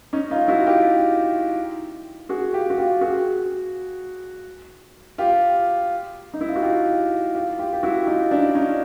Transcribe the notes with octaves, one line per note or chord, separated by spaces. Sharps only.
C#4 D#4
D#4 F4
E4 F#4
F4 G4
F#4 G#4
F4 G4
F#4
F4 G4
F#4 G#4
F4 G4
D#4
E4
F4
F#4
F4 G4
F4 G4
F4 G4
G4
E4 F#4
D#4 F4
D4 E4
C#4 D#4